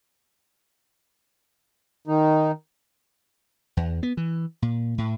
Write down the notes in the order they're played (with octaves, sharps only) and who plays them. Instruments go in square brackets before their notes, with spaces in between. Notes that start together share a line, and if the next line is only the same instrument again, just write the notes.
[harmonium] D#3 D#4
[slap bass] E2
B3
E3
A#2
A2